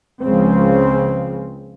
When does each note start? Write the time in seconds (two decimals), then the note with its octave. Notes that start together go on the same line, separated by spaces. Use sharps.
0.21 C#2 C#3 F3 G#3 C4